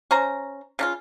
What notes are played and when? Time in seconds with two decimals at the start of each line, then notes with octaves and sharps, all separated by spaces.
0.11 C#4 C5 A#5
0.79 C#3 D4 F4